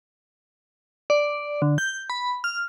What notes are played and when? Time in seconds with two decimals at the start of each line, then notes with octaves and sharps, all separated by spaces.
1.10 D5
1.62 D3
1.78 G6
2.10 B5
2.44 F6